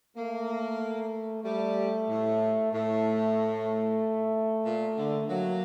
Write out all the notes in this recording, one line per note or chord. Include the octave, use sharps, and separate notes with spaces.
A3 A#3
G3 A3
A2
A2 A3
A#2
D3
F#3 A#3